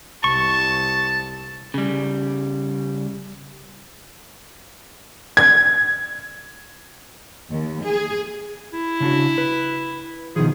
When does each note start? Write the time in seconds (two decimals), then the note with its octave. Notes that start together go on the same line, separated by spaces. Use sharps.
0.24 C2 A5 C#6
1.74 C#3 G3
5.37 G#6
7.50 D#2
7.82 G#4
8.74 E4
9.00 C#3 D4 F#4
9.38 B4
10.36 B2 D#3 F3 G#4